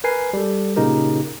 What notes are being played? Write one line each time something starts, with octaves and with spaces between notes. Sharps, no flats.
A#4 B4 G#5 C7
G3 A4
A#2 C#3 D#4 G4 A#4